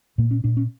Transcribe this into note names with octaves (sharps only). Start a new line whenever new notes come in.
A#2 A#3
C#4
A#2 D4
C#4